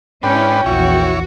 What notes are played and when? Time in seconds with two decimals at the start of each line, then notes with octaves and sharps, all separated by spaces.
0.23 G#2 C#4 D4 E4 B4 G5
0.66 A#1 E2 A#2 E4 F#4 C#5